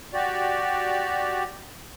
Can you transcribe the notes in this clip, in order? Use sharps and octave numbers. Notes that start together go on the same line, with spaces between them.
F#4 G4 D5